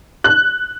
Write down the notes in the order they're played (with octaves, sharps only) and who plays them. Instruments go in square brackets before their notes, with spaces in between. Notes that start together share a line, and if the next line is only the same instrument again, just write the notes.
[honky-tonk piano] F#6